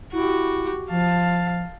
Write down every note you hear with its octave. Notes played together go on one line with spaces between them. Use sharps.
E4 F#4 G4
F3 F5 A5